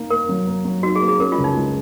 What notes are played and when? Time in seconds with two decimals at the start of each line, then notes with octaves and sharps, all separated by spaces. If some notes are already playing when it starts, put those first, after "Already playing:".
Already playing: A#3 D#4
0.10 A#3 A#4
0.29 F#3
0.47 A#3
0.65 F#3
0.83 D#4 F#4
0.96 G#4
1.01 A#3
1.08 G#4
1.20 C#4 A#4
1.32 F4
1.38 C#2
1.44 D#4
1.57 G#3